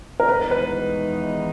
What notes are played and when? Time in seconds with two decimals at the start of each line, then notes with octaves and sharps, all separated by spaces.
0.20 A#4
0.29 E2 D#3 G#3 D#4 B4
0.51 B4